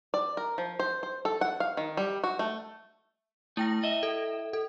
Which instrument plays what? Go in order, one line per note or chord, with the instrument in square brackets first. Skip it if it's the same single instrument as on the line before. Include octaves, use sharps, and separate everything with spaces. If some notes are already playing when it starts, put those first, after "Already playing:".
[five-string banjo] D5
A#4
F3
C5
C5
A4
F#5
F5
D#3
G3
F#4
A3
[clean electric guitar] A3 [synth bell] E4 G5 A#6
[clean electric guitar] D#5 E5
[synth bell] A4
A4